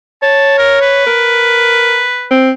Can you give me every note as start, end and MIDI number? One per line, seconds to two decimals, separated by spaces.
0.22 1.03 73
0.22 0.58 81
0.58 0.80 70
0.82 2.34 71
1.07 2.04 70
2.31 2.50 60